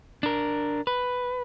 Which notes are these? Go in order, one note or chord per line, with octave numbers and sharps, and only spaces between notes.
D4 A#4
B4